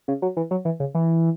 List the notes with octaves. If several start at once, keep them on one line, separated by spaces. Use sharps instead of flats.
C#3
F#3
E3
F#3
E3
C#3
E3